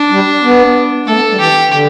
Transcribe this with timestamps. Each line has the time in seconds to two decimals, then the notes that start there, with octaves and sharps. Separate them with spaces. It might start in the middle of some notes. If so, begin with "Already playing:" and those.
Already playing: D4
0.10 G3
0.43 B3
1.07 A3 A4
1.15 B3
1.32 G3
1.39 E3 G4
1.71 D3